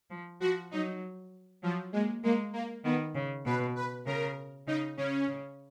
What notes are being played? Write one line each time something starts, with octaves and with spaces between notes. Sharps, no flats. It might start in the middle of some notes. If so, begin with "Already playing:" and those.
F3
F3 F#4
F#3 D#4
F3 F#3
G#3 A#3
G#3 A#3
A#3
D#3 B3
C#3
B2 B4
B4
C#3 A#4
C#3 D#4
C#3 C#4
C#3